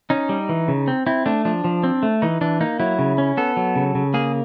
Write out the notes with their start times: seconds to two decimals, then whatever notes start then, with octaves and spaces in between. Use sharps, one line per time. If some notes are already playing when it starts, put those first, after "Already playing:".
0.10 C#4 D#4
0.29 G3
0.49 E3
0.68 C#3
0.88 C4
1.06 C4 E4
1.26 A3 D4
1.45 F3 D4
1.64 F3
1.84 C4
2.03 A3
2.22 E3 D#4
2.41 E3 D4
2.61 A#3 D#4
2.80 F#3 E4
2.99 C#3
3.18 C#4
3.37 B3 A4
3.57 F#3
3.76 C#3
3.95 C#3
4.14 A#3 G#4